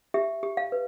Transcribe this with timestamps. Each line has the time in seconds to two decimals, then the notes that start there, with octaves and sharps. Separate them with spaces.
0.14 G4 E5
0.43 G4
0.57 F5
0.72 B4